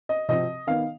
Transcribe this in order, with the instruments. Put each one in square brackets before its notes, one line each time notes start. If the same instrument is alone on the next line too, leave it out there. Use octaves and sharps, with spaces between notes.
[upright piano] D#5
C3 F3 C4 D#5
D#3 B3 F5